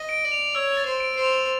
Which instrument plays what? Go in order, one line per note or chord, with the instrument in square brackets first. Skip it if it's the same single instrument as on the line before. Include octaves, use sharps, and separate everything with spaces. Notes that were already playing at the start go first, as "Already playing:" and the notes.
Already playing: [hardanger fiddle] D#5
[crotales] D7
[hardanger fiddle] D5
[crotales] F7
[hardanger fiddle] C#5 [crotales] E6
[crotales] A6
[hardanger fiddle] C5
[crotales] D7
[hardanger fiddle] C5
[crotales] F7